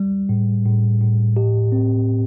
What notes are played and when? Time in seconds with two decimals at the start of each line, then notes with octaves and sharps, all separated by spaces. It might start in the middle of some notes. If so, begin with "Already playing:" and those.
Already playing: G3
0.29 A2
0.65 A2
1.01 A2
1.37 G4
1.72 C4